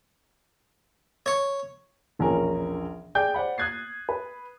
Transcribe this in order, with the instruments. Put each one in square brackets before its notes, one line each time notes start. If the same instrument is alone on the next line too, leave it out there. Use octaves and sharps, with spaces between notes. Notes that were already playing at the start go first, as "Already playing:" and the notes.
[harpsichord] C#5
[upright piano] E1 A#1 F3 C#4 A#4 G#5
G#4 D5 G5 G6
C5 D5 F#5 B5
D#6 F#6 G#6 A6 C7
B4